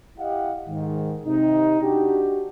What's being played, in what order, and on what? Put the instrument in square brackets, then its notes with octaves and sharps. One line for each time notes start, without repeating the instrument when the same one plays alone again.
[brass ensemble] E4 G4 D#5 F5 F#5
G#2 D#3
C3 D#4
D4 F#4 G4